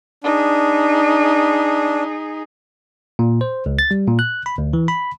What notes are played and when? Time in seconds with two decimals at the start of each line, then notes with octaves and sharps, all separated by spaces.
0.24 D4 D#4 G#4
3.19 A#2
3.41 C5
3.66 C#2
3.79 A6
3.91 G3
4.07 A#2
4.19 F#6
4.46 B5
4.58 D2
4.73 E3
4.88 B5